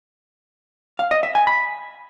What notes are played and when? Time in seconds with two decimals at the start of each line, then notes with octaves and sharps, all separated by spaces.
0.99 F5
1.11 D#5
1.23 E5
1.35 G#5
1.47 B5